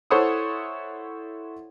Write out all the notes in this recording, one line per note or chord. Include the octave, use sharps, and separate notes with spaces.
E4 A4 C5 C#5 F#5 D#6